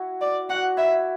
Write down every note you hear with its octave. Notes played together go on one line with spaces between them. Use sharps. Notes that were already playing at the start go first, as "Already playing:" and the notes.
Already playing: E4 F#4
D5
F#4 F#5
E4 E5